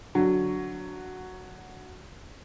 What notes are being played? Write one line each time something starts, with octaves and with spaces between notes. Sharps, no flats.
D3 F#3